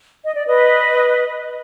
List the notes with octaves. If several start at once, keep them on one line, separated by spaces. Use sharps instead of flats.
D#5
D5
B4 D#5